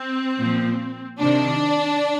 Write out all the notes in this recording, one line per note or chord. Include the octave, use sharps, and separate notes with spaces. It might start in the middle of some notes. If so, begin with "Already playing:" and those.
Already playing: C4
A#2 F3
C3 D#3 D4